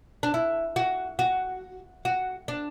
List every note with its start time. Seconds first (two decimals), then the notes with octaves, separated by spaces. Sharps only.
0.23 D4
0.34 E4
0.76 F#4
1.19 F#4
2.05 F#4
2.48 D4